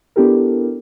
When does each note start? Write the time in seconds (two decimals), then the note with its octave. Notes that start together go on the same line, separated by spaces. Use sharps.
0.16 B3 D4 E4 G4 A4 A#4